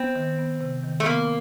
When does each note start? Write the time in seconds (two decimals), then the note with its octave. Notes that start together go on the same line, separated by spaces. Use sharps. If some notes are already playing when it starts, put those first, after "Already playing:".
Already playing: B3 C4
0.16 D#3
0.39 B3
0.61 C3
0.84 D#3
1.00 A3
1.05 A#3 B3